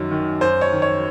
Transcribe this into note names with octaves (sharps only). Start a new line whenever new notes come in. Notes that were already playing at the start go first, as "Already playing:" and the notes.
Already playing: F#2 D#3 F#3
D#3
F#2 C5
C#5
D#3
C#5